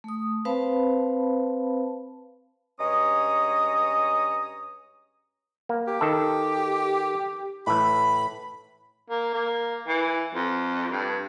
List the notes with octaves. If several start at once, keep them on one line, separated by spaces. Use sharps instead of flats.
A3 D#6
C4 B4 C5 F5 A5 B5
G2 G#3 C#4 A#5 D#6
A#3
G4
D#3 A4
A2 E3 B5
A#3
A#3
E3
F2
G2